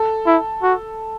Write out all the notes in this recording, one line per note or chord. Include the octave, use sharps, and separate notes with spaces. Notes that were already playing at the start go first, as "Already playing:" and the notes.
Already playing: A4
E4
F#4